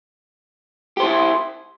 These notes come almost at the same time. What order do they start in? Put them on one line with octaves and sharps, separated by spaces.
G4 C5 E4